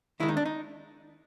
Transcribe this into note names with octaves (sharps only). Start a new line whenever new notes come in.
D#2 D#3 G#3 E4
D#4
D4
D#4